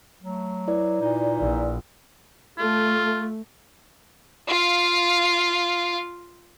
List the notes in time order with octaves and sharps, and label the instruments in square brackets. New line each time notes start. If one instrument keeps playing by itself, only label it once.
[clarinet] F#3 [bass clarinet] A3
[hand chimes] E4 B4 D5
[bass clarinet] A#2 [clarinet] D#4
[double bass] A#1
[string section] A3 [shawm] F4
[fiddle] F4 F5